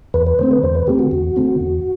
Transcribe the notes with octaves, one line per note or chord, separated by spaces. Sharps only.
E2 B4
B4
D3 A3 C4 C5
B4
E2 C5
B4
D3 A3 C4 G4
F#4
E2
D3 A3 C4
E2